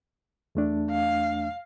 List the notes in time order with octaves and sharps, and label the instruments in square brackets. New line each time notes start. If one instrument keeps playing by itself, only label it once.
[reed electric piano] E2 A3 D4
[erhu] F5